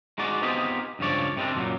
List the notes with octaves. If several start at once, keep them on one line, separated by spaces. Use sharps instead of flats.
G#3 D#4 F#4 D5
B3 C4 D#4 F4 G4 G#4
C#2 G2 F3 C#5 D5
C3 D#3 G3 A#3 C4 D4
F#2 A#2 D3 F#3